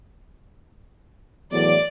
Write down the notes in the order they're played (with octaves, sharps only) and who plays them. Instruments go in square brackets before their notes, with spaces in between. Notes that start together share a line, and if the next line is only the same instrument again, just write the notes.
[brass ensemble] E2 A2 F#3 [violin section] D5